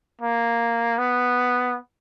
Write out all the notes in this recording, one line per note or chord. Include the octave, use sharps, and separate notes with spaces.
A#3
B3